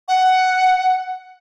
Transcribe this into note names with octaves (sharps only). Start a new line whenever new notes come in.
F#5